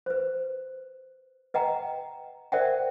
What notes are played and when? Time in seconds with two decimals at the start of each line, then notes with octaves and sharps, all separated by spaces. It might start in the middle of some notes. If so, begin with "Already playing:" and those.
0.06 B4 C5
1.54 B4 D#5 F#5 G5 A#5
2.52 A#4 C5 D5 E5 F#5 G5